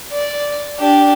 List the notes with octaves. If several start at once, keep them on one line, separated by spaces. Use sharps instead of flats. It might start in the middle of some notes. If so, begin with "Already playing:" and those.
D5
D4 G4